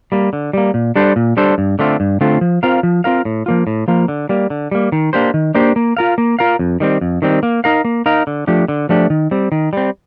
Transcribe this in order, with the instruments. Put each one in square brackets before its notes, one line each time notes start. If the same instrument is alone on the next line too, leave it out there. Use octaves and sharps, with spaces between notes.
[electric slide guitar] G3 A#3
D3
G3 A#3
A#2
G3 D4 A4 C5
A#2
G3 D4 A4 C5
G2
D3 A3 C4 F4
G2
D3 A3 C4 F4
F3
C4 F4 A#4 F5
F3
C4 F4 A#4 F5
A2
F3 A#3 F4
A2
F3 A#3 F4
D3
G3 A#3
D3
G3 A#3
D#3
A#3 D4 G4 C5
D#3
A#3 D4 G4 C5
A#3
F4 A#4 F5
A#3
F4 A#4 F5
F2
D#3 G3 C4
F2
D#3 G3 C4
A#3
D#4 A#4 F5
A#3
D#4 A#4 F5
D3
F3 A3 D4 G4
D3
F3 A3 D4 G4
D#3
G3 C4
D#3
G3 C4